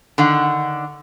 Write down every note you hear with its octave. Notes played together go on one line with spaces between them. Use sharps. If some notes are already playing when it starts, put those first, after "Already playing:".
D3 D#3 F#5